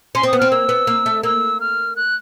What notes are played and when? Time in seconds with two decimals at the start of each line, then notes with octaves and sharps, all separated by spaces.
0.15 C#4 C6
0.23 C4 D#6
0.33 B3
0.39 C4 F6
0.51 A#3 E6
0.69 B3
0.87 A#3
1.06 A3
1.23 A#3 E6
1.60 F6
1.96 F#6